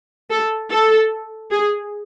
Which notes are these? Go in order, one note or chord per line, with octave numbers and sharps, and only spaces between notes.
A4
A4
G#4